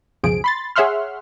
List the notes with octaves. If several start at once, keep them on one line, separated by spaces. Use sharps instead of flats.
C#2 F#2 B2 F3 G#4 D7
B5 C6 A6
G#4 C#5 E5 F#5 C6 F6